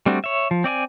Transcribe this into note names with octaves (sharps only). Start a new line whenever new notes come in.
G3 A3 C4 D4 F#4
C#5 E5
F3
C4 D5 D#5 G#5